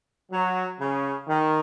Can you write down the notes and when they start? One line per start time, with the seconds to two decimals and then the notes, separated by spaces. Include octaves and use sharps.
0.31 F#3
0.80 C#3
1.28 D#3